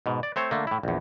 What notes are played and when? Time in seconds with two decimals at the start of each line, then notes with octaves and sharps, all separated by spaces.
0.06 G#2 B2
0.23 D5
0.36 A3 C4 C5 C#5
0.51 D3 A3 A#3
0.67 A2 E4
0.83 A#1 E2